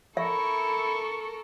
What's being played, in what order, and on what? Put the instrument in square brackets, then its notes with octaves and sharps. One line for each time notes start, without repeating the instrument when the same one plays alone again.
[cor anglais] E4 [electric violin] A4 A#4 [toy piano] E5 [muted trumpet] C#6